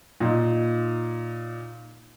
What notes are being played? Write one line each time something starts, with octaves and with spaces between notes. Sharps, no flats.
A#2 D#4